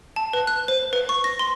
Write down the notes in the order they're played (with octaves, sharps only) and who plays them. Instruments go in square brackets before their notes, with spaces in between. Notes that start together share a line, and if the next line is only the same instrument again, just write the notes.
[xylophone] A5
B4
F#6
C5
B4
C#6
A#6
C6